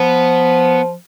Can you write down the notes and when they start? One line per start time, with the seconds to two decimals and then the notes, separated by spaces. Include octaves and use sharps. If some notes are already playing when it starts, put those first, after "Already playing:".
Already playing: F3 B3